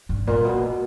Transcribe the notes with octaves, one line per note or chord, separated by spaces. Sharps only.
G2
A#2
B2